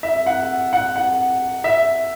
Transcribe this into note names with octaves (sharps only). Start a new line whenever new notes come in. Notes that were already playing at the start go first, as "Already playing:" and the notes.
E5
F#5
F#5
F#5
E5